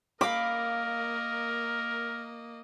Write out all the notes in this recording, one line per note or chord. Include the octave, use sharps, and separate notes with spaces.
A#3 A#4 D#5 F5 B5 D6